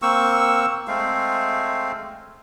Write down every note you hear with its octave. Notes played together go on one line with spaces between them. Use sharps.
A#3 C4 C#6 E6
G#3 A3 C4 F5